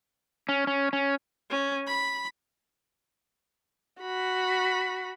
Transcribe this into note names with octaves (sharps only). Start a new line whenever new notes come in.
C#4
C#4
C#4
C#4
B5
F#4 B5